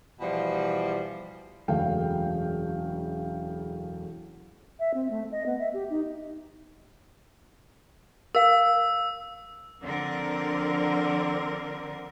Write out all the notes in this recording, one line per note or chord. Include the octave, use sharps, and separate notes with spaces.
B2 E3 F3 G3
E1 F#2 C#3 A3 F5 G5
E5
C4
A3
D#5
B3
E5
G4
D#4
A#4 F5 E6
D3 F3 C4 A#4